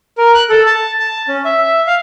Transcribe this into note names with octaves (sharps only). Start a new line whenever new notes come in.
A#4
F#6
A4
A5
A5
C#4
E5
E5
F5